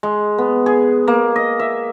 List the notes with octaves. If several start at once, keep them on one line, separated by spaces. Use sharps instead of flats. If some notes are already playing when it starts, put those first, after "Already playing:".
G#3
B3
G#4
A#3
D#5
E5